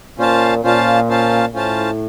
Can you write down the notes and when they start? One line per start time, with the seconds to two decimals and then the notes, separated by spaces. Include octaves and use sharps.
0.18 A#2 C#4 F4 C5 F5 A5
0.63 A#2 C#4 F4 C5 F5 A5
1.09 C#4 F4 C5 F5 A5
1.54 A2 C#4 F4 C5 F5 A5